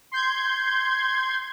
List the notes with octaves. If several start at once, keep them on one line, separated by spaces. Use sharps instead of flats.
C6 G6 G#6